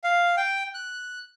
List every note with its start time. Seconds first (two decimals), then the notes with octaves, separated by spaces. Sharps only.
0.04 F5
0.37 G5
0.74 F#6